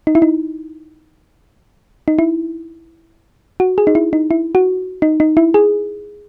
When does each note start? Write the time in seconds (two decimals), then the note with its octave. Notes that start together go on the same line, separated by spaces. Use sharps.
0.07 D#4
0.15 E4
0.22 D#4
2.08 D#4
2.19 E4
3.60 F#4
3.78 G#4
3.87 D#4
3.95 E4
4.13 D#4
4.31 E4
4.55 F#4
5.02 D#4
5.20 D#4
5.37 E4
5.54 G#4